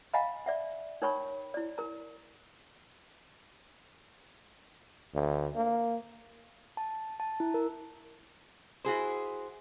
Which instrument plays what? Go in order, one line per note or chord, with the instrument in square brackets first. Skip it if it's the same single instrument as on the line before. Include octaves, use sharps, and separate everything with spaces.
[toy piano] D#5 F5 F#5 G#5 A#5 B5
D5 E5 F#5
D#4 A#4 C#5 G5 B5 C#6
E4 D5
A#4 A#5
[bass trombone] D2
A#3
[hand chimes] A5
A5
E4
A#4
[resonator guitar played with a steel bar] E4 F#4 G#4 C5